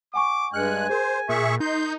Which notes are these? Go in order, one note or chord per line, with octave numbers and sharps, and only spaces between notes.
F#5 G#5 C#6 D6
G2 G#3 G#5 F6 F#6 C#7
G#4 A#4 C5
A#2 G#4 A#4 E5 C#6
D#4 C6 G6